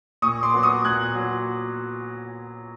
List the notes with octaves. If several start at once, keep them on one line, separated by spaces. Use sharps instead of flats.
A#2 C#6 D#6
C6 D6
F#3 B3
C#6 D#6
A#2 F#6 G#6
F#3 B3